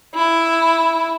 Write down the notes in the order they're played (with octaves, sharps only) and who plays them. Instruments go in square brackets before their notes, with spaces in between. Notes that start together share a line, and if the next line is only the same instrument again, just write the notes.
[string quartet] E4